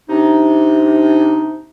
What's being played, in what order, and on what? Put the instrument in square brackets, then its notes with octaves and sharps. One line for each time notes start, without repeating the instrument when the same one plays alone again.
[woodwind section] C3 D4 D#4